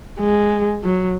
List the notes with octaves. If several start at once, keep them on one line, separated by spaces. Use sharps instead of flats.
G#3
F#3